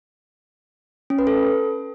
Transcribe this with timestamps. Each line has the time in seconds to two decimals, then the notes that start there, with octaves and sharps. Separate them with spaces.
1.10 C#4
1.19 B4
1.27 A4